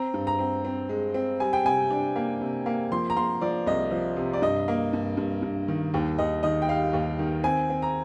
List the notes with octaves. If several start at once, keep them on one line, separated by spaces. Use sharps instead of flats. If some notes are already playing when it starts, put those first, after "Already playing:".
Already playing: C4 A#5
G2
A#5
C4
C4
G#3
C4
G3 G#5
G5
C3 G#5
D4
A#3
C3
A#3
F3 C6
A#5
A#3 C6
F3 D5
C2 D#5
F3
C3
D5
G2 D#5
A#3
G2
G2
G2
D#3
D#2
D#2 D#5
D#3 D#5
G5
G3 F5
D#2
D#3
C4 G#5
C4
A#5